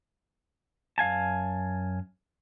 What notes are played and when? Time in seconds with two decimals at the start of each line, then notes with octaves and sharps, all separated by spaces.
0.98 F#2 F5 G#5 A5